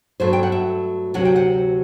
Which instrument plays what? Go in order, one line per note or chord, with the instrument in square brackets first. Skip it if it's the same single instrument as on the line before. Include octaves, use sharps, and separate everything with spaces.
[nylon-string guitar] G2 F#3 A3 C5
G5
F#5
E5
D2 C3 F#3 F#5
G5
F#5